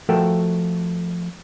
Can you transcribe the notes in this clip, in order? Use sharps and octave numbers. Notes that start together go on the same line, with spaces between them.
F3 A3 F#4 A4 A#4 G5